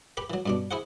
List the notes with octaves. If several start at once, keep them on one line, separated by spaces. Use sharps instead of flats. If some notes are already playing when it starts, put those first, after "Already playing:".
G4 B4 B5
E3 F#3
G2 B2 D4
E4 G#4 C5 F#5